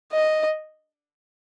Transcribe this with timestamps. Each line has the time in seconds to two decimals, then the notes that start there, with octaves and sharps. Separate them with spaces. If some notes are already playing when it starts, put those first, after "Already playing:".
0.12 D#5